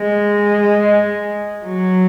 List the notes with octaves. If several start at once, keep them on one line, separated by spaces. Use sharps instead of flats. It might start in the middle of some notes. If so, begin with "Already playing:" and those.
Already playing: G#3
F#3